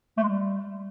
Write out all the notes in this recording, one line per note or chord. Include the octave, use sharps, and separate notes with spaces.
A3
G#3
G3